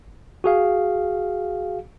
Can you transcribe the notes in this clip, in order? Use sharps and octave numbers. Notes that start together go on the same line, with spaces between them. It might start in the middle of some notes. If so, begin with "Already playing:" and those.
F#4 G#4 F5